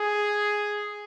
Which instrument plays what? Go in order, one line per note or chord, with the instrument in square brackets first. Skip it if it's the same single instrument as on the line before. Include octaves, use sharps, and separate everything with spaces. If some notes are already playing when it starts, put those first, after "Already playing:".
Already playing: [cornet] G#4